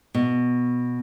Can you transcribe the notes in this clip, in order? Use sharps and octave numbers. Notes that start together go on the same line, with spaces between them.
B2